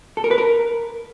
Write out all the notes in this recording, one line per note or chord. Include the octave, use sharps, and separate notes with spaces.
A4
A#4
B4
A#4